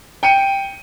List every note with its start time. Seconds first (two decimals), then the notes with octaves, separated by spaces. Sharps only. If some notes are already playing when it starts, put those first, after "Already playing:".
0.23 G5 C#7 D#7